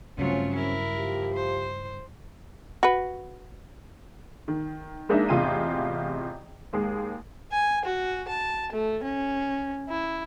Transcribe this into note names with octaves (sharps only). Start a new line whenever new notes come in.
G2 C#3 F#3 A3 C4 C#4 F4
E4 A#4
F3 F4 G4
C5
F#4 B4
D#3
G#3 A#3 D4 D#4 E5
A1 E2 C3 F4 G#4 D#7
D#2 G#3 G#4
G#5
F#4
A5
A3
C#4
E4